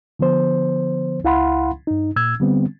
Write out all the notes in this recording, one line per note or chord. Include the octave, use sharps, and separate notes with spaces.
D3 F3 B3 C5
C#2 E4 F5 F#5 B5 C6
G2 D#4
A#2 E6 G#6
D3 G3 B3 C4